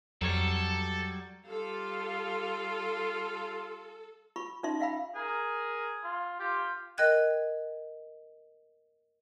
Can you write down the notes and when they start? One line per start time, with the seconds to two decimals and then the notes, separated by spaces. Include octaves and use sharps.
0.22 F2 F#3 G3 A4 C#5
1.48 G3 F4 A4 F5
4.36 F4 B5 C#6
4.63 C#4 D#4 F4 E5 C6
4.80 E5 F5 G5 B5
5.15 G#4 A#4
6.03 F4
6.40 F4 G4
6.98 A#4 D#5 G5 F#6 G#6